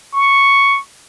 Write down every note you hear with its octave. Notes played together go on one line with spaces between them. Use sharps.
C#6